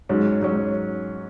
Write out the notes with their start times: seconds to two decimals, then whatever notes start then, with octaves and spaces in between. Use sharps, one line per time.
0.09 G#2 F#3 C#4
0.41 G#2 F#3 C#4